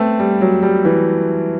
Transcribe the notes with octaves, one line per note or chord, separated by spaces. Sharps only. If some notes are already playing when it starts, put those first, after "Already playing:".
Already playing: A3 B3 C4
G3
F#3
G3
E3